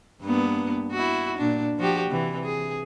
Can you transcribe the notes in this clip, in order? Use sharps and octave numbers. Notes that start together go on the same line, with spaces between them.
G2 A#3 B3
E4 F#4
A#2 D4
F3 F#4 G4
C3 E3
G#4